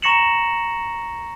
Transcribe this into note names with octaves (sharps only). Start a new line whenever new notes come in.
A#5 C#6 A#6 C#7 E7 F#7